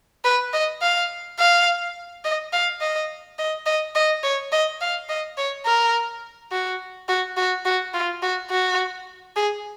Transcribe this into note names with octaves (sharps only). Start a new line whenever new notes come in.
B4
D#5
F5
F5
D#5
F5
D#5
D#5
D#5
D#5
C#5
D#5
F5
D#5
C#5
A#4
F#4
F#4
F#4
F#4
F4
F#4
F#4
G#4